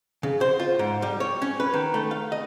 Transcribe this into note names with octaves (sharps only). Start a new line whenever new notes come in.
C#3
C5
F4
G#2
G3
C#5
C#4
B4
D#3
A3
F5
D#5